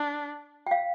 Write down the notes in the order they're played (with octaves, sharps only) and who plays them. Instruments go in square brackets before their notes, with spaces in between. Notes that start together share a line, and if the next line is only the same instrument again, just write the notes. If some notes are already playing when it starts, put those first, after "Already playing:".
Already playing: [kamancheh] D4
[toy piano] G5
F5